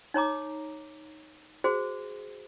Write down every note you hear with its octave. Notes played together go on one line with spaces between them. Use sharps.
D#4 C#5 A#5 D6
F#4 G#4 C5